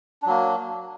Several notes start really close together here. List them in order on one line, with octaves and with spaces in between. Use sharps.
D4 F#3 A#3